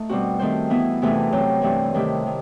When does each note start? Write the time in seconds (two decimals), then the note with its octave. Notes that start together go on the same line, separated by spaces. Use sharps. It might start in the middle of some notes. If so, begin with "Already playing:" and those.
Already playing: A3 D#4
0.09 B2 G3 C4 F#4
0.39 D#3 A3 C4 F#4 C5
0.70 E3 B3 E4
1.02 E2 C3 E3 A3 D#4
1.32 C3 F#3 C4
1.62 G2 E3 A3 C4
1.94 C3 D#3 A3 E4 G4
2.26 D#3